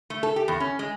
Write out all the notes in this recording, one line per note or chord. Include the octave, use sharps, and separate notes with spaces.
A3
A4
G4
E2
C#4
G#3